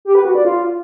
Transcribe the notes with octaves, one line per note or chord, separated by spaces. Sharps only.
G4
B4
F#4
D5
F4